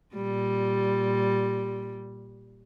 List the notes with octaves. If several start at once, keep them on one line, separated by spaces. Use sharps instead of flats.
A#2 G3